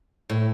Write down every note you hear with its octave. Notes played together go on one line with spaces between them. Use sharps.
A2